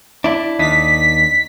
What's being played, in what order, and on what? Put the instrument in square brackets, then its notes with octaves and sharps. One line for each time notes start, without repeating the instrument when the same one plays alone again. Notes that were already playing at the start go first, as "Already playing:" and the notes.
[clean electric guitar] D4 E4
[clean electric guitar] D#2 D4 D#4 [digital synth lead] B6